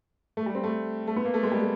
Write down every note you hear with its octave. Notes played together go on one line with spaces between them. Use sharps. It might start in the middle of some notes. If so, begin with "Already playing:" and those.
A3
G3
C4
A3
A3
B3
A#3
A3
G#3
G3
G#3